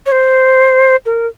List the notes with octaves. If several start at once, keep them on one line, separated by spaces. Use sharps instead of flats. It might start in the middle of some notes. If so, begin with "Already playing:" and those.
C#5
C5
A#4